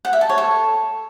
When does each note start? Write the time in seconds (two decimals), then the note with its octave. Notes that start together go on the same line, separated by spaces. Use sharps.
0.05 F#5
0.13 E5
0.21 A5
0.29 C#5
0.38 A4